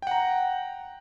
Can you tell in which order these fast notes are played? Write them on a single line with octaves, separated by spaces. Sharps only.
G5 F#5 A#5